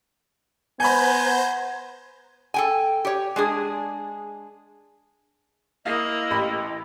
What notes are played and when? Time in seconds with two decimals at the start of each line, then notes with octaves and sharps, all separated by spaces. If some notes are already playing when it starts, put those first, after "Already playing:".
0.80 B3 C5 G#5 A#5 B5 G6 G#6
2.54 A4 G5 G#5
3.05 G4 C#5
3.36 G#3 D4 G#4
5.86 A#3 E4 D#5 F5 D#6
6.30 A1 G4 B5